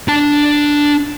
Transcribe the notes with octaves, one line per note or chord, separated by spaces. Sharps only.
D4 A5